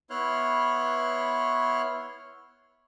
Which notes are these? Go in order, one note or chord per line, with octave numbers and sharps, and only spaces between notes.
B3 E4 C#5 C6 F6 F#6